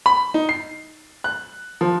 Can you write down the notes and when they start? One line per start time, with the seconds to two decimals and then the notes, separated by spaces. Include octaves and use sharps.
0.06 B5
0.34 D#4
0.49 C7
1.24 F#6
1.81 F3